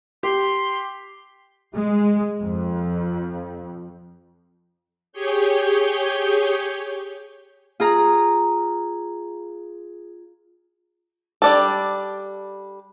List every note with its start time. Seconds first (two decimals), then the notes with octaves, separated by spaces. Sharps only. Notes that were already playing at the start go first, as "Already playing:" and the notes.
0.23 G4 C6
1.75 G#3
2.40 F2
5.13 G4 G#4 C#5 G6
7.80 F4 G#4 A#5
11.42 G3 D4 A4